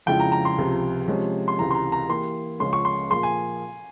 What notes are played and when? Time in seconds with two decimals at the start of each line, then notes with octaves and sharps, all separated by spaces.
0.06 F2 C#3 F3 G#3 E4 G5
0.20 A#5
0.32 A#5
0.45 C6
0.58 C#2 C3 F3
1.08 C3 F3 G#3 C#4
1.48 C6
1.58 C#2 C3 E3 A#5
1.71 C6
1.75 A#5
1.92 A#5
2.09 E3 A#3 E4 G4 C6
2.60 C#2 C#3 F3 G#3 C#4 C6
2.73 C#6
2.85 C6
3.10 A#2 F3 A#3 F4 G#4 C6
3.23 G#5